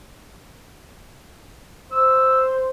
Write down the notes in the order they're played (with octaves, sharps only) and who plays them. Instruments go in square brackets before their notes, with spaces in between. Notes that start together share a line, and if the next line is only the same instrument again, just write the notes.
[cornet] C5 [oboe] E6